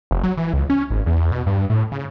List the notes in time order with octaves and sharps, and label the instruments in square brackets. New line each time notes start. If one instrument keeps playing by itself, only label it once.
[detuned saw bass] F1
F#3
E3
C#2
C#4
G#1
E2
B2
G2
A2
C#3